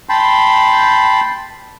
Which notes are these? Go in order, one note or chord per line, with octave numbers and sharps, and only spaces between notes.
G5 A5 B5 C6